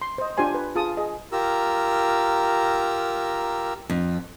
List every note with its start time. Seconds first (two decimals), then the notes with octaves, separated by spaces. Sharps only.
0.02 C6
0.18 C5 D#5
0.37 D4 F4 G4 C5 G#5 C6
0.54 B4
0.75 F4 G#4 A5 D#6
0.97 G#4 D#5
1.32 F4 G4 A#4 A#5 E6
3.90 F2